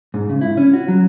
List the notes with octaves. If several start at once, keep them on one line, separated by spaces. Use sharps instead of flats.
G#2
C#3
E4
C#4
F#4
F#3